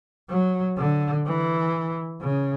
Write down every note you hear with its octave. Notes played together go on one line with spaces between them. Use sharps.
F#3
D3
E3
C#3